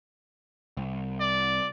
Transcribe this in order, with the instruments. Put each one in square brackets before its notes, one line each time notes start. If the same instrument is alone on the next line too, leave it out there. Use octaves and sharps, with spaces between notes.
[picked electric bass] C2
[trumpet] D5